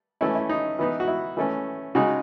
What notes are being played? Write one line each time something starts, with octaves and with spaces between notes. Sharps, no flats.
E3 A3 C#4 E4
E4
D#4
E3 B3 D#4
F#4
E4
E3 A3 C#4
C#3 G#3 D#4 F#4